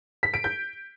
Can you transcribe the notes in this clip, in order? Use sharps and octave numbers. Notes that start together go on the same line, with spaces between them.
B6
D7
G6